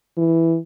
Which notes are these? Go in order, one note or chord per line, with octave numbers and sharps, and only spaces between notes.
E3